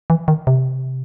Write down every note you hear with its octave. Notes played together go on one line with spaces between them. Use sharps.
E3
D#3
C3